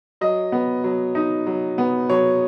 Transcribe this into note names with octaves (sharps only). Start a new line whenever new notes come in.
F#3 D#5
B3
F#3
D#4
F#3
B3
F#3 C#5